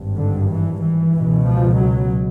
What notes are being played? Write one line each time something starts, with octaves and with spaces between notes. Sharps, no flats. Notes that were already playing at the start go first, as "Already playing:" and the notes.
Already playing: G#1 G2
D3
E3
E3
C#2 B2
F3
F#3